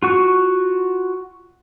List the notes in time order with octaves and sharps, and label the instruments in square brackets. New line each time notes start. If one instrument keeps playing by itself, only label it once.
[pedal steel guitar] F4 F#4 C#6